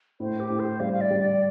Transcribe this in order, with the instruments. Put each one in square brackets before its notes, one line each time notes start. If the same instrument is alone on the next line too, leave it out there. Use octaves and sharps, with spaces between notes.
[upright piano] A2 [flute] C5
[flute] G4
[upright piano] A2
[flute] C5
[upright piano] G3 [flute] F5
[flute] F5
D5
[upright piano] G3
[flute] D5